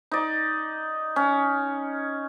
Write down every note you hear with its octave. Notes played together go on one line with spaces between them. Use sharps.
D#4 D5
C#4